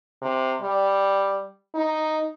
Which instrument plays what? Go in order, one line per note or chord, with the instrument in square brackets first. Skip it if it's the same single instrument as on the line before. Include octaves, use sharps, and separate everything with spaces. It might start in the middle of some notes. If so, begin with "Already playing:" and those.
[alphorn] C3
G3
D#4